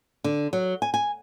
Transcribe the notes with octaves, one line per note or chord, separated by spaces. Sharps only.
D3
F#3
G#5
G#5